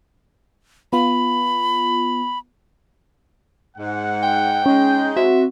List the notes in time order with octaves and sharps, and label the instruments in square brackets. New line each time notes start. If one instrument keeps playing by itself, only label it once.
[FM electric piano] B3 F4 [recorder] B5
[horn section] G#2 F#5
[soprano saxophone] G5
[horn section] G#3 D#4 [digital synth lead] C#4 [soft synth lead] G6
[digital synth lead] C4 [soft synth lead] F#4 [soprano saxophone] E5